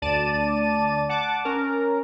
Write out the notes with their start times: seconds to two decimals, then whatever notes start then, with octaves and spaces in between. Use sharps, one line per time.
0.02 D2 D5 A5 D#7
1.09 F#5 A5 D6
1.45 C#4 A#4